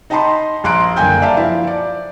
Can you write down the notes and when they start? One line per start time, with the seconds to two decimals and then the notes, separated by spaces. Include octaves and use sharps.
0.10 D#4 D#5 G5 A5 B5 C6
0.64 A#1 A#5 C6 F#6 D7
0.96 F#1 D3 A#3 G5 G#5 G6
1.22 D5 E5 F5 A5 A#5
1.37 F3 E4
1.67 D5